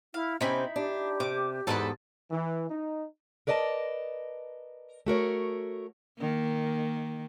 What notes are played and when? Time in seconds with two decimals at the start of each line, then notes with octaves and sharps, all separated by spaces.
0.14 E4 F5
0.41 C3 C4 C#4 D#4 E4 B5
0.76 D4 G4
1.20 C3 D6
1.67 E2 G#2 A4 B4 D#5 A5
2.30 E3
2.69 D#4
3.47 A#4 B4 D5 D#5 G5 A5
5.06 A3 F#4 A#4 C#5
6.18 D#3 A#3